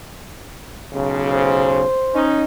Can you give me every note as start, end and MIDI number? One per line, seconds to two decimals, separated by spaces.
0.93 1.83 35
0.93 1.83 49
1.33 2.26 72
2.14 2.44 61
2.14 2.44 63